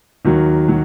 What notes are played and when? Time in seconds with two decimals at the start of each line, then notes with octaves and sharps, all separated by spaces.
0.25 D#2 D#3 F#3
0.68 F#3